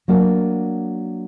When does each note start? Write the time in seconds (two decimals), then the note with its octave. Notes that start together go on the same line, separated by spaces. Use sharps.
0.08 F#3 A#3 D4 F#4